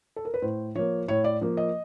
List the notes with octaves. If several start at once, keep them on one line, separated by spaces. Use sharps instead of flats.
A4
A#4
B4
A2 C5
F3 A#3 C#5
A2 C#5
D5
F3 A#3
D#5